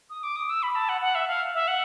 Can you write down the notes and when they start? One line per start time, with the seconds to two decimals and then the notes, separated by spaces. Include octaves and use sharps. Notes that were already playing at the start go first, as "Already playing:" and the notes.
0.10 D#6
0.23 D6
0.36 D#6
0.50 E6
0.63 B5
0.75 A5
0.89 F#5
1.02 F#5
1.15 E5
1.28 F5
1.54 E5
1.68 F#5